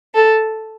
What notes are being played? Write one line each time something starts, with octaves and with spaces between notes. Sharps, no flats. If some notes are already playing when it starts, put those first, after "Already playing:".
A4